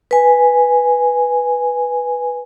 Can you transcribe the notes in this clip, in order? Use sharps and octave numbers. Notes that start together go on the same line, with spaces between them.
B4 G#5